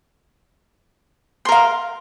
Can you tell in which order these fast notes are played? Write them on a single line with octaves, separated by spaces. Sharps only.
C6 A#4 F5